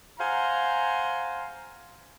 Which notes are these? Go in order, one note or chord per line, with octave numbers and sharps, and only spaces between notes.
C5 F5 F#5 G#5 A#5